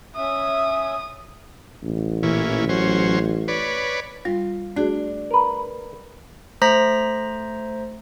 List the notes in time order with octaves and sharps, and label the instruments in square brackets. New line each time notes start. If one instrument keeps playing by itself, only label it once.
[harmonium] C#4 E5 [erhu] D#6
[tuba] A1
[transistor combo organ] A#2 E3 C#4
F#3 C#4 C5
B4 C#5 D5
[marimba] G3 [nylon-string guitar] F4
[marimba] A3 F#4 G#4 [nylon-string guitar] D4
[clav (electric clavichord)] A#4 B4
[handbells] A3 C5 A#5 A#6 B6